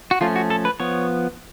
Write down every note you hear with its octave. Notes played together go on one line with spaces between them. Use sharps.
F#4
F3 A3 C#4 F4
F#4
A4
B4
F3 B3 C#5